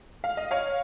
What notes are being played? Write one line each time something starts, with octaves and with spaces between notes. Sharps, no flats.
F5
D#5
C#5 F5